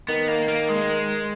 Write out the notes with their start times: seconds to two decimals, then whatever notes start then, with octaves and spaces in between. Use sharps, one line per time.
0.08 D#3 B3
0.28 A#3
0.48 A#3
0.69 G#3